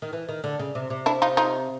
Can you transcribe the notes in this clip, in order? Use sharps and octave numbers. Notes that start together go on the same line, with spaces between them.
D#3
E3
D#3
D3
C#3
C3
C3
D4 E4
D#4 F4
D#4 F4